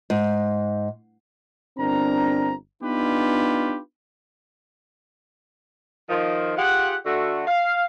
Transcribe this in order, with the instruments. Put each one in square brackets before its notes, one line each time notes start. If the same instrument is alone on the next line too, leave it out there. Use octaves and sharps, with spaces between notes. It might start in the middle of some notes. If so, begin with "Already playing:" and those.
[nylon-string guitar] G#2
[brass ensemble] G1 C4 D4 A#4 A#5
B3 D4 D#4 F4 G4 B4
[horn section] D#3 F3
F4 G4 G#4 F#5
D3 A3 F#4
F5